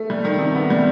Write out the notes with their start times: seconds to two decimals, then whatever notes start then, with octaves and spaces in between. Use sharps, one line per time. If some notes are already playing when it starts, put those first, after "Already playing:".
Already playing: A3
0.10 G3
0.25 D#3
0.39 C3
0.55 B3
0.70 G3